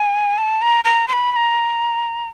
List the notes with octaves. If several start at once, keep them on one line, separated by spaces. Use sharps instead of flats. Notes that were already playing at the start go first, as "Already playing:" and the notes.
Already playing: G#5
A5
A#5
A#5
C6
B5
B5
A#5